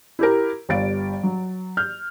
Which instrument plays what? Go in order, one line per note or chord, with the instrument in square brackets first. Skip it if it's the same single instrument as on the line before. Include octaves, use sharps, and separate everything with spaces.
[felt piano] E4 G4 A#4
G1 G3 F5 A6 D7
F#3
F6 G6